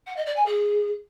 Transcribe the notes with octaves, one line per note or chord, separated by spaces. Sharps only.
F#5
D#5
D5
G#5
G#4